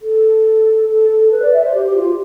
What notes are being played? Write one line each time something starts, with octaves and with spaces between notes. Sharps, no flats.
A4
A4
A4
B4
D5
E5
C5
G4
G4
F4